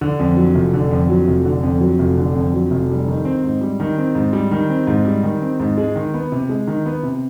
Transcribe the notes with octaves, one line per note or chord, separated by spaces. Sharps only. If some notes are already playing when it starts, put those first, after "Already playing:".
D3
F2
F#3
F1
D3
F2
F#3
F1
D3
F2
F#3
F1
D3
F2
F#3
F1
G3
D#3
C4
G#2
G3
D#3
C4
G#2
G3
D#3
C4
G#2
G3
D#3
C4
G#2
G#3
D#3
B3
C3
G#3
D#3
B3
C3